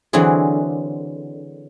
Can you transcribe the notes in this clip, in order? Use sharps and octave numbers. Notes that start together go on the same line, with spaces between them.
D3 E3 F#3 C4 G#4